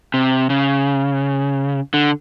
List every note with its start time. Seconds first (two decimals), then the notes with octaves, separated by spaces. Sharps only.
0.14 C3
0.50 C#3
1.94 D3